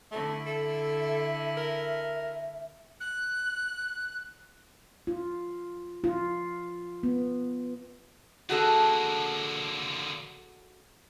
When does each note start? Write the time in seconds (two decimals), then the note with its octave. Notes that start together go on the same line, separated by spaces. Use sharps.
0.12 D3 A3 E4
0.46 A4 E5
1.57 A#4
3.00 F#6
5.07 F4
6.04 F4
7.03 B3
8.49 D3 A#3 F#4 G#4 A4